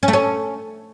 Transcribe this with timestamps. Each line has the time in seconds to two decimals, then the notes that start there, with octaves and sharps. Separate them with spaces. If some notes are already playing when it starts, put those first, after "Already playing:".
0.03 C#4
0.08 A3
0.13 C#4